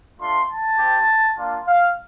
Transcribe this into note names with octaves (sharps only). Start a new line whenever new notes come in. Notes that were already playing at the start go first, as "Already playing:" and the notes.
A3 D4 F4 C6
A5
C4 G4
A#3 D4 F4
F5